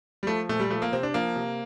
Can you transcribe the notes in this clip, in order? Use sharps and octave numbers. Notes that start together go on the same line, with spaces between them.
G3
F3 A3
A#2 A3
G3
F3 A3
A#3
C3 C4
D4
F3 A#3
C3